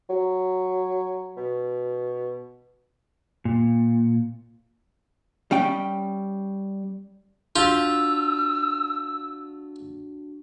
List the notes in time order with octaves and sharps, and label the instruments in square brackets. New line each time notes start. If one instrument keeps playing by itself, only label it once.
[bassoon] F#3
B2
[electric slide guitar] A#2
[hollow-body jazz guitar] G3 C#4 G5
[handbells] D4 F#4 [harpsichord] F4 [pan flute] E6